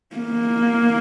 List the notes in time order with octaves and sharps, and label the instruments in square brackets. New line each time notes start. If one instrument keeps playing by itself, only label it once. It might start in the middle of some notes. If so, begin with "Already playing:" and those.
[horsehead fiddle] A#3